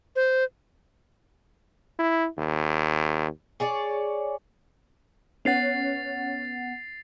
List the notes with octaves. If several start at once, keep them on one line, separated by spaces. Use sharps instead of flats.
C5
E4
D#2
G#4 C#5 D5
B3 C#4 F#5 A6 C7 F7